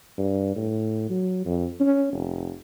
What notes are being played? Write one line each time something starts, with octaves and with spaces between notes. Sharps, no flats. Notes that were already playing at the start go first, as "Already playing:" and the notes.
G2
A2
F#3
F2
C#4
F1